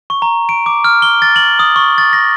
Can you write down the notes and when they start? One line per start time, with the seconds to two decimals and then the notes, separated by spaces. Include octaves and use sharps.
0.10 C#6
0.22 A#5
0.49 D7
0.66 D6
0.84 F6
1.02 G7
1.22 A6
1.36 F#7
1.59 D#6
1.76 C#6
1.98 A6
2.13 A#6